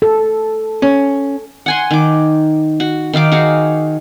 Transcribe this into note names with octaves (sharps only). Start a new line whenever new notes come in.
A4
C#4
F#5 G#5 C6
D#3 D6
F#4
D#3 D#4 F5 D6
F#4 G#4 F5